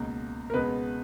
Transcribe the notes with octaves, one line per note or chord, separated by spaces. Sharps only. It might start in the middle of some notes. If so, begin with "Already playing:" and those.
Already playing: C#2 B2 A#3
A#4
C#2 B2 G#3 B3 B4